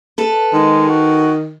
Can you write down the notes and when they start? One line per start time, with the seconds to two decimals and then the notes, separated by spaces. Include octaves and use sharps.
0.18 A4 B4
0.53 D#3 G#3
0.89 F#4